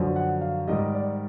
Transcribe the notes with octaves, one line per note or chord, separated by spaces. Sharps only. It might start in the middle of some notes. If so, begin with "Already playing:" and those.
Already playing: F#2 D3 F3
F#5
F5
G#2 D#3 G3 D#5
D5